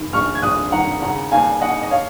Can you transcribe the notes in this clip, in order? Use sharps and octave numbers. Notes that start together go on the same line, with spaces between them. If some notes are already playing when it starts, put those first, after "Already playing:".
Already playing: F1 D#3
A#1 C#6 F6
G#6
A#1 D#6 F#6
D#3 F#5 A#5
C#3 F#5 A#5
D#2 F5 G#5
D#2 D#5 F#5
D#5
C#5 F5